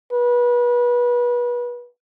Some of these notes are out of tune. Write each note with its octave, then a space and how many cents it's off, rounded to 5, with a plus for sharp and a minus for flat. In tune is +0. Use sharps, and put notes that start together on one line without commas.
B4 -30